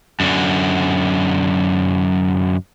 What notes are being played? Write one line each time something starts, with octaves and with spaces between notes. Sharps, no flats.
F#2 D3